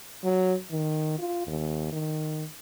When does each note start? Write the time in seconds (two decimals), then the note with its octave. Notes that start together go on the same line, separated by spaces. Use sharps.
0.24 F#3
0.71 D#3
1.18 F4
1.47 D#2
1.92 D#3